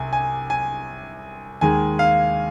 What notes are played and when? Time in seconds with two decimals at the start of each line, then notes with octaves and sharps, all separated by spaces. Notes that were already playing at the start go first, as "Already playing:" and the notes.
Already playing: C2 C3 G#5
0.13 G#5
0.50 G#5
1.61 D#2 D#3 G#3 G#5
1.99 F5